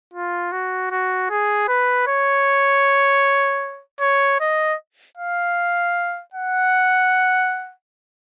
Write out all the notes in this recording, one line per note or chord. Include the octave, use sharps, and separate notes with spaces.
F4
F#4
F#4
G#4
B4
C#5
C#5
D#5
F5
F#5